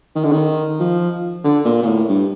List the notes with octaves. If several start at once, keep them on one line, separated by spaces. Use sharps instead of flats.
D#3
D3
D#3
F3
D3
A#2
A#2
A2
G2